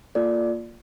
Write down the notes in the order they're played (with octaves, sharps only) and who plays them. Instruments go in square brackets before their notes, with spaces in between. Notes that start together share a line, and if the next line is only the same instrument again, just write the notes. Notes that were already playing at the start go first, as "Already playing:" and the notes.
[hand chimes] A#3 F4 A4 D5